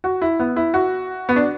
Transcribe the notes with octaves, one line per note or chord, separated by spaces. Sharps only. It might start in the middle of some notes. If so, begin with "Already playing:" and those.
F#4
E4
B3
E4
F#4
B3
D4